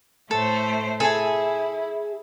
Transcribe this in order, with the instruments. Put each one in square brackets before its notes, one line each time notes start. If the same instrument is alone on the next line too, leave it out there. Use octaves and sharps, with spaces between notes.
[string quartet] A2 A3 C5 [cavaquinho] A4
[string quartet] E4 [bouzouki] G#4 [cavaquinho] A4 G#5